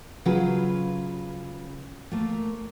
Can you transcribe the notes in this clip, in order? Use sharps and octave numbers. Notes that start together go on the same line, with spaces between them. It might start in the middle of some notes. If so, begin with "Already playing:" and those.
C#3 F#3 F4 G#4 B4
A3 A#3